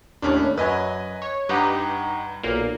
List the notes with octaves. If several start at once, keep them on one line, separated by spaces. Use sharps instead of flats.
D#2 A2 C#4 D4
F#2 F#3 B4 D#5 G#5
C#5
G2 D#4 G4 B4 F#5 A#5
B1 A#2 A#3